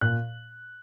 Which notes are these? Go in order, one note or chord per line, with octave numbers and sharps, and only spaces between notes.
A#2 F#6